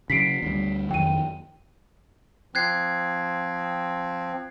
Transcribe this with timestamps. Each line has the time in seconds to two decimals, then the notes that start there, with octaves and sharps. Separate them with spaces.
0.10 C#3 F#3 B6 C7 D7
0.43 D2 F#3 G3
0.91 F2 D#3 F#3 G5 D#7
2.55 F3 C4 F#6 G#6 C7